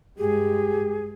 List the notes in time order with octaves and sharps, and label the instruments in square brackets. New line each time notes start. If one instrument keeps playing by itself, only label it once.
[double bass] G2 G#3 [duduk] G4 [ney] G#4